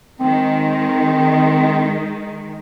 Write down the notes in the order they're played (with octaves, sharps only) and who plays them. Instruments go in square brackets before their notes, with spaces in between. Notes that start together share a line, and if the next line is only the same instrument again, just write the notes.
[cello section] D#3 G#3 [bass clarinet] C4